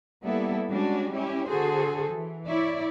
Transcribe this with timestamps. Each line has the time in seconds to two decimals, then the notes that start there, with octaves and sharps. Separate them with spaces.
0.23 G3 A#3 B3 E4 A4
0.68 G3 G#3 C#4 D4 F#4
1.13 C#4 E4 G4
1.48 D3 F#4 G#4 A4 C5
2.11 E3
2.47 E4 C#5 D5